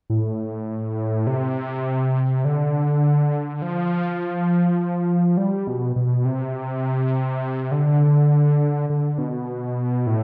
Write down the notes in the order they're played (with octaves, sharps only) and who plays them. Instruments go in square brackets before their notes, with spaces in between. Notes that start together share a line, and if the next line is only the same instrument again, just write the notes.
[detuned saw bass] A2
C3
D3
F3
G3
B2
B2
C3
D3
D3
B2
A2